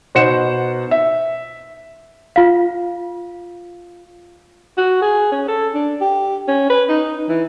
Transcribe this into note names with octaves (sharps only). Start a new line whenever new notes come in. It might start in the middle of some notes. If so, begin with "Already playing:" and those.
B2 D#4 C5 F#5 C#7 E7
E5
F4 F5
F#4
G#4
C#4
A4
D4
G4
C#4
B4
D#4
E3